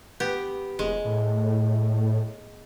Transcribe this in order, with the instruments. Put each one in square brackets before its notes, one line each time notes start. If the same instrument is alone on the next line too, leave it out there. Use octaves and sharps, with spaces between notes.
[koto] B3 G4
[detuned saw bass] F1 [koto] G#3
[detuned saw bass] A2